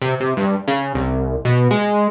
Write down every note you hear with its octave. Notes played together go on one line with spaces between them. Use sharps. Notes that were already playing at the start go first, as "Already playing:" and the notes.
C3
C3
G2
C#3
C2
B2
G#3